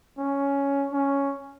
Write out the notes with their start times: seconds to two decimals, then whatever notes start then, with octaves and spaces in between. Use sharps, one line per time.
0.18 C#4
0.93 C#4